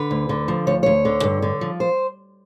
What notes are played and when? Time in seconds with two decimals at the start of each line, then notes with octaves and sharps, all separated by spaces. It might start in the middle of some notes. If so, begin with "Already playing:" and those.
Already playing: D3 B4
0.11 D2
0.29 D3
0.48 F3
0.67 D2 C#5
0.83 D2 C#5
1.05 D3
1.23 G2
1.42 D3
1.61 F3
1.80 C5